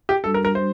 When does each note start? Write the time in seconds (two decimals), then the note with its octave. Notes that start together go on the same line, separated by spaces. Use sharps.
0.09 G4
0.24 G3 D4 F#4 A4
0.34 A#4
0.45 A#4
0.55 C5